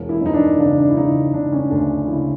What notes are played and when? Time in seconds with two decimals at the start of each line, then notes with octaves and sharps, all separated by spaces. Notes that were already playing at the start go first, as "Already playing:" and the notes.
Already playing: E1
0.09 E4
0.21 E1 D#4
0.34 D4
0.58 C#3 D4
0.78 D4
0.89 E4
0.96 C#3 D#4
1.33 C#3 D4
1.52 C#4
1.70 D2 D4
2.07 C#3 E4